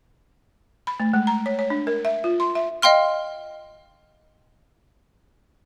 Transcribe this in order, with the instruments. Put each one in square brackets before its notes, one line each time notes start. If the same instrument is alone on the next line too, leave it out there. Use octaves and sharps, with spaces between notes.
[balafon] B5
A3
G#3
A#5
C#5
C#5
D4
A#4
E5
F4
C6
E5
[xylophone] D#5 F5 G5 C6 F6